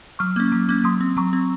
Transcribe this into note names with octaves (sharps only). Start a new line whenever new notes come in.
F#3 C#6 F6
A#3 C#4
F#3
A#3 C#4
F#3 C6 D#6
C4
F#3 A#5 C#6
C4